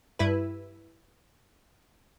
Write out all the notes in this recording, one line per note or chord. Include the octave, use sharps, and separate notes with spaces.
G2 E4 B4